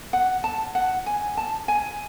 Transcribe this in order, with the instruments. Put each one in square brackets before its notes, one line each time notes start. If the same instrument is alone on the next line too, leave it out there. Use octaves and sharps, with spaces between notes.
[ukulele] F#5
A5
F#5
G#5
A5
G#5